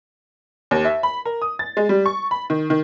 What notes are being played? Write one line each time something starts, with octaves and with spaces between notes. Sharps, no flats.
D#2
E5
B5
A#4
D#6
A6
G#3
G3
C#6
B5
D#3
D#3